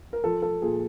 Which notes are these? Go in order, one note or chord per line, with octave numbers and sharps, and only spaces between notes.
A#4
F3 A4
A4
A#2 G#4